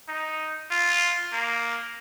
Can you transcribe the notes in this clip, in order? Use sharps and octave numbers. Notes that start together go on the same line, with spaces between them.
D#4
F4
A#3